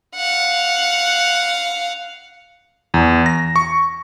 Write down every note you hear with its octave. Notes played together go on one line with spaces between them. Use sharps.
F5 F#5
E2
A#6
C#6